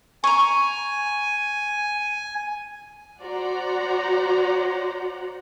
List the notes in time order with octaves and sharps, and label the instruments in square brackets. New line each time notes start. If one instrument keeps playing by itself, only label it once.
[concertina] G#5 [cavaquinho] A#5 C#6
[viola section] F#4 C5 D5 F#5 A#5